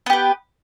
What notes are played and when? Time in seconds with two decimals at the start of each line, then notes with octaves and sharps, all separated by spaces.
0.06 B3
0.10 G4
0.13 B4